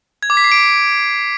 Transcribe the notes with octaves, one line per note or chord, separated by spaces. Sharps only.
G#6
D6
B6
C7
D7